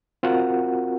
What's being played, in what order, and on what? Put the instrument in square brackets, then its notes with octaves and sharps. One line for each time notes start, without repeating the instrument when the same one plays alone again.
[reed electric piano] C4 F4 F#4 A#4 F#5